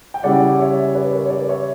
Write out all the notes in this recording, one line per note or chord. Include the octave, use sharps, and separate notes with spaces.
G5
C#3 G3 C#4 E4 D5 F#5
C#5 E5
B4 D5
A#4 C#5
C#5
B4 D5
C#5 E5